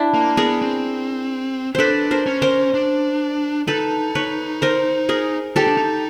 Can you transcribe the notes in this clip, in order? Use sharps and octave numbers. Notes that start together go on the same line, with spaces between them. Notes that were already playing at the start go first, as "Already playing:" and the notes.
Already playing: D4 E4
A#3
B3 G#4 A#4
C4
D4 A4 B4 C5
A#4 C5
C#4
A#4 C5
D4
D#4 A4 B4
B4 C#5
A#4 C5
G#4 A#4
D#4 G4 A4
D4
D#4